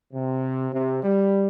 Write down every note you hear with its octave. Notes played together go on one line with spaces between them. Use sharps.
C3
C3
G3